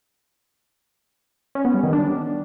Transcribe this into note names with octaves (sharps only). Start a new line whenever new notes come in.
C#4
B3
G3
D#3
D4